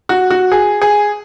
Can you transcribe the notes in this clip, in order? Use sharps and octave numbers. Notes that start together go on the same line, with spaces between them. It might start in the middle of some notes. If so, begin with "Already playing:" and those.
F#4
F#4
G#4
G#4